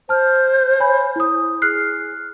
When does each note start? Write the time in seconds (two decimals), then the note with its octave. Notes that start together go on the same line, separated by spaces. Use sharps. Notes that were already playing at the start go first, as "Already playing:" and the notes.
0.09 C5 A5 F6
0.80 C#5 G#5 B5
1.16 E4 D#6
1.62 G#4 F6 F#6 C7